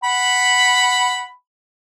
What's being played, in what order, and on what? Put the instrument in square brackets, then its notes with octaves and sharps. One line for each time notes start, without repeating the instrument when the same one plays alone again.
[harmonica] F#5 B5